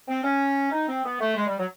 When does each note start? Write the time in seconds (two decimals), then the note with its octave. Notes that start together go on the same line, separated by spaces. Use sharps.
0.08 C4
0.24 C#4
0.72 D#4
0.88 C4
1.05 B3
1.20 A3
1.36 G#3
1.47 G3
1.58 F#3